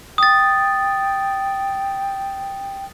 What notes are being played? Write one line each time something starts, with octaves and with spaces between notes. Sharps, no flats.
G5 D#6 A6